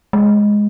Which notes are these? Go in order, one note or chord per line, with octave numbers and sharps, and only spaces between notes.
G#3